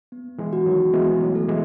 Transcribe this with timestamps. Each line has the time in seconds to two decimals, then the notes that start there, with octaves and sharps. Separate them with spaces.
0.12 B3
0.38 E3 G#3
0.53 F#4
0.66 D#3 F#3
0.93 E3 G#3 B3
1.21 F#3 A3
1.35 A4
1.48 E3 G#3